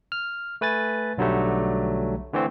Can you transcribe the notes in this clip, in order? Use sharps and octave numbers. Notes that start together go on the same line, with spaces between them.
F6
A3 B4 G#5 A6
B1 D3 F#3 G3 A3
D3 E3 A3 C4